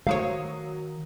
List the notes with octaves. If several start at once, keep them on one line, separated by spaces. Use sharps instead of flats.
D#3 F#3 A3 C5 C#5 F5 D#6